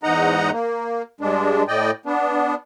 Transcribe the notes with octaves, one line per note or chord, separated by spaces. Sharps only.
E2 G#2 D#4 D#5 F#5 A#5
A#3
G2 G#3 D4
A2 D5 D#5 G5
B3 D4